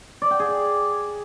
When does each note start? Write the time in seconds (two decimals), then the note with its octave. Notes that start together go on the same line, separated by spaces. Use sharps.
0.22 D5
0.31 G5
0.40 G#4
0.48 D5